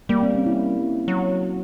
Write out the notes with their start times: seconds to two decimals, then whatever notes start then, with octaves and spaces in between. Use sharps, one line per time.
0.09 G3 A#3
0.23 C4
0.35 C#4
0.46 E4
1.08 F#3